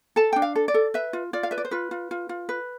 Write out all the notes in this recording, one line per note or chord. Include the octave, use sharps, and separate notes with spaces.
A4 A5
D4 G5
F5
A4
D5
A4
B4 E5
F4
F4 D5
F5
B4 E5
D5
C5
F4 B4
F4
F4
F4
B4